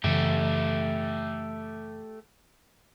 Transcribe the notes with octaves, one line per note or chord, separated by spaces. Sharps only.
F#2 C#3 E3 A3 G4